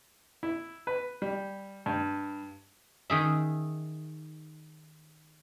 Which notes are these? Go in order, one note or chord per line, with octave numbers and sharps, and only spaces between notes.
E4
B4
G3
G2
D#3 G#4 E5